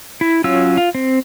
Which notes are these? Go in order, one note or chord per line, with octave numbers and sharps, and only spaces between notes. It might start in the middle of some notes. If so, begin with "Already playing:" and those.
E4
F#3 C#4 F4 E6
F4
C4